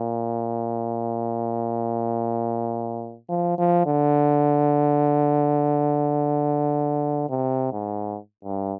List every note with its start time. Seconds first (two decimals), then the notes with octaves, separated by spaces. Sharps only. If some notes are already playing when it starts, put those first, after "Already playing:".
Already playing: A#2
3.29 F3
3.58 F3
3.86 D3
7.30 C3
7.72 G#2
8.44 G2